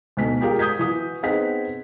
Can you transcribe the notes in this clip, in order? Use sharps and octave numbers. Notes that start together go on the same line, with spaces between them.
D2 B2 D#4 B6
F4 G4 G#4 A#4 F5 G5
D#6 G6 G#6 B6
E3 F#4 D#6
B3 C4 D#4 G#4 F#5 B6